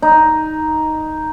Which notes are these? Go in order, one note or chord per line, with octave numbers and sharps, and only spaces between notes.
D#4